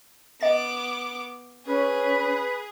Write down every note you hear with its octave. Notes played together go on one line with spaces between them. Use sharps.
B3 D#5 D6 A6
C#4 G#4 B4